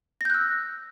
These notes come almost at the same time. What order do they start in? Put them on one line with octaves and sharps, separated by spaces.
A#6 G6 F#6 E6